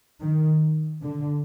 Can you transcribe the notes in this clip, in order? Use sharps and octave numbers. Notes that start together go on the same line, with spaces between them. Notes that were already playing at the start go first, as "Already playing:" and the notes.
D#3
D3